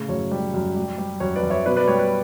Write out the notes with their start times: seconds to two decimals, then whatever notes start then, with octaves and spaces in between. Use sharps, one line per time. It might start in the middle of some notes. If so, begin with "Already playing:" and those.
Already playing: A2 C#3
0.08 F#2 C#5
0.31 G3
0.54 F#2
0.76 G3
0.98 G3
1.20 F#2 C#5
1.36 B4 D5
1.43 F#2
1.50 C#5 E5
1.65 B2 B4 D5
1.76 B4 D5
1.88 G3 C#5
1.99 B4